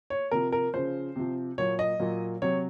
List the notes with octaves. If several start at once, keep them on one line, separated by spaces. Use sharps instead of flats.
C#5
C3 F3 A#4
A#4
C#3 F3 C5
C3 F3
A#2 F#3 C#5
D#5
A#2 F#3
C3 F#3 C#5